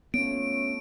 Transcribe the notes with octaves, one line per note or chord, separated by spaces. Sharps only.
A3 B3 C#4 F4 C#5 D7